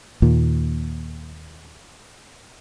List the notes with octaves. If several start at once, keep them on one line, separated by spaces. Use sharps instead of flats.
D#2 A#2